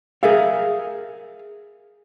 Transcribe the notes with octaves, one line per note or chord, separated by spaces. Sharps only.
G#4 A#4 E5 F5